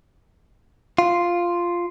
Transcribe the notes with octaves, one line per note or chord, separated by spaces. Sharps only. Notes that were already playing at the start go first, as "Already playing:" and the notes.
F4